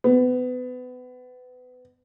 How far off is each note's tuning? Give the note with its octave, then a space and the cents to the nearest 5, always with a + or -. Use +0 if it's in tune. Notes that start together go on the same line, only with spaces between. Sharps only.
B3 +25